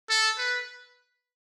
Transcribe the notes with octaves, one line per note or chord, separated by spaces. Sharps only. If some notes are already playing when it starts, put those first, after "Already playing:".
A4
B4